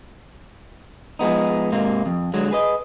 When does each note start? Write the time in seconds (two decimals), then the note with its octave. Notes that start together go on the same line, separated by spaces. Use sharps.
1.19 F3 G#3 B3 D#4
1.72 G#2 C3 A#3
2.06 F2
2.34 D3 F#3 G#3
2.51 G#4 B4 D#5